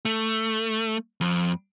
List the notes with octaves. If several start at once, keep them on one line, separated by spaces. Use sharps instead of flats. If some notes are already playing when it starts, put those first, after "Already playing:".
A3
F2